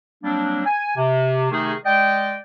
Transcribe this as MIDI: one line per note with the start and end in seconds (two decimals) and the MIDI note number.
0.24 0.64 54
0.24 0.64 55
0.24 0.64 58
0.24 0.64 60
0.24 0.64 62
0.66 0.95 80
0.97 1.47 48
1.51 1.75 48
1.51 1.75 51
1.51 1.75 57
1.51 1.75 63
1.51 1.75 68
1.85 2.37 56
1.85 2.37 74
1.85 2.37 75
1.85 2.37 79